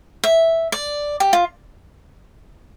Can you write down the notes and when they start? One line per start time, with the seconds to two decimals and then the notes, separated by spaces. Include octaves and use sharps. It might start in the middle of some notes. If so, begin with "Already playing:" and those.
0.24 E5
0.72 D5
1.20 G4
1.33 F4